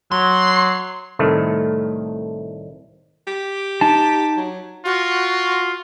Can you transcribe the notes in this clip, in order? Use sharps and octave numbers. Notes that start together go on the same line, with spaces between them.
F#3 C6
C2 A2 D#3 A3
G4
D#4 A5
F#3
F4 F#4